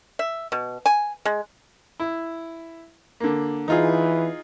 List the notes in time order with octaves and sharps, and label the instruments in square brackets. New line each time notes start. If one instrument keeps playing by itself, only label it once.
[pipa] E5
B2
G#5
G#3
[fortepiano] E4
D3 A#3
[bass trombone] E3 [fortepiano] D#4 F4 G#4